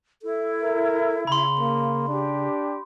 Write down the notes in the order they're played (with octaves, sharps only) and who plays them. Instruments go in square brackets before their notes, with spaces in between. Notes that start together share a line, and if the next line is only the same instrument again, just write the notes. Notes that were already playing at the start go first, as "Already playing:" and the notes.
[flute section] E4 [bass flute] A4
[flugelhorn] A#4
[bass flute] C#3 [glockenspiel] B5 C6
[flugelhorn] A#3
[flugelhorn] D4 [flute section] G4